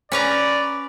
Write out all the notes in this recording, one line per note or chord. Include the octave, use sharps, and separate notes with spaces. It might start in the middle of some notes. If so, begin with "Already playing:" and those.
C#4 B4 D5 A#5